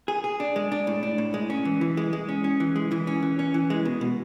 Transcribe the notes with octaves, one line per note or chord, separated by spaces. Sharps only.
G#4
G#4
D4
G#3
D4
A2
D4
A2
G#3
C#4
E3
E3
G#3
G#3
C#4
C#4
E3
G#3
E3
C#4
E3
C#4
E3
G#3
B2
B2